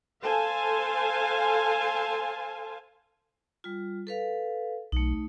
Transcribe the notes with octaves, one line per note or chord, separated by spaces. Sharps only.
A4 C5 F5 G#5 A5
G3 F4
A4 B4 F5
B1 A3 D#4